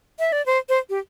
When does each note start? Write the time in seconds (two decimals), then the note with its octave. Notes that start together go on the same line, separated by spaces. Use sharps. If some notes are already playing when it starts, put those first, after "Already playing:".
0.19 E5
0.32 D5
0.46 C5
0.69 C5
0.90 G4